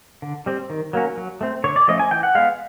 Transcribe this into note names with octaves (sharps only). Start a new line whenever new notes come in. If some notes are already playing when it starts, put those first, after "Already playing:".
D3
G3 C4
D#3
F#3 A#3 C#4
F#3
A3 C4
D3 C#5
D5
F3 A3 C#4 D#5
G#5
E3 G5
F#5
G#3 B3 F5